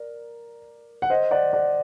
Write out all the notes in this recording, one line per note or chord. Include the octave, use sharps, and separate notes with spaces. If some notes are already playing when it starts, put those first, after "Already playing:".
Already playing: A#4 D5
F#5
C5 D#5
D5 F#5
D5 F#5